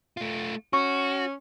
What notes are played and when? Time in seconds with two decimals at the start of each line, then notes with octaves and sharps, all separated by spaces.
0.17 A3 F4
0.73 C#4 F#4 C#6